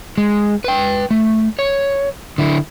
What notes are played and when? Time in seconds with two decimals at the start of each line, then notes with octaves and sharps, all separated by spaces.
0.18 G#3
0.64 B4 G5
1.11 A3
1.59 C#5
2.38 D3 E4